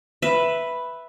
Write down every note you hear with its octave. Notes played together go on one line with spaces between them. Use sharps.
B4 E5